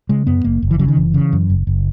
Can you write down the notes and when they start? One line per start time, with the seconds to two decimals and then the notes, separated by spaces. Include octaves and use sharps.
0.09 C#3 G#3
0.27 F#2 B3
0.44 F#1 A#3
0.63 F#1
0.71 E3
0.79 C#3 F#3
0.88 D#3
0.97 F#1 E3
1.14 C#3
1.33 F#2
1.50 F#1
1.67 F#1